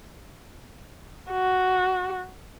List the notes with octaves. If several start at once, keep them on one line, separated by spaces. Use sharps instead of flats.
F#4